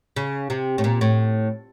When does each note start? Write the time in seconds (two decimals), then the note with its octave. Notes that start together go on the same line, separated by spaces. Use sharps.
0.16 C#3
0.50 C3
0.78 A2
0.84 A#2
1.01 A2